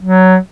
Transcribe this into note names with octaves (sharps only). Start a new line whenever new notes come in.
F#3